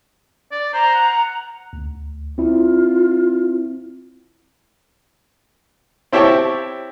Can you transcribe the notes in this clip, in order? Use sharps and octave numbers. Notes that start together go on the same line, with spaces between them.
D5
C5 A#5
F#5
D2
C4 E4 F4
C4 E4 G4 C#5 G5 A5